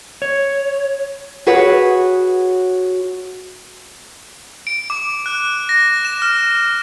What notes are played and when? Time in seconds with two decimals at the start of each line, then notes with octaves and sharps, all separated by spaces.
0.22 C#5
1.47 F#4 G#4 B4 C#5 F#5
4.67 D7
4.90 D6
5.26 F#6
5.69 A#6
6.05 E7
6.22 F6